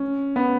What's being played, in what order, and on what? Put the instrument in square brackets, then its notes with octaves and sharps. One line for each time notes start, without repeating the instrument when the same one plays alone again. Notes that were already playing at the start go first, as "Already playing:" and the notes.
Already playing: [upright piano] C#4
B3